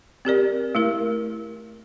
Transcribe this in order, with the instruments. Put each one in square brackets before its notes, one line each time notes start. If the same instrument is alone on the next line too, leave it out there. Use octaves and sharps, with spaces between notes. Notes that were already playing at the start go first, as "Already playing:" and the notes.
[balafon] C4 G4 A#4 D5
A3 E4 A#4